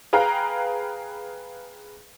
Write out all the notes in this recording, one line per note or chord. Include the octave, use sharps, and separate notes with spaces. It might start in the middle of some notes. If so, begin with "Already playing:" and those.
G#4 B4 F5 G5 A#5